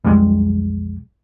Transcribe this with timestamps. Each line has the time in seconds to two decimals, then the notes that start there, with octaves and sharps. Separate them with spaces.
0.05 B1 F2 G3 G#3